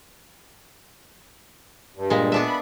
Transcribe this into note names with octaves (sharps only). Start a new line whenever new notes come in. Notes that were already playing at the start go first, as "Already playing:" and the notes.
G2
A#2 G#3
B3 D4 E5
B5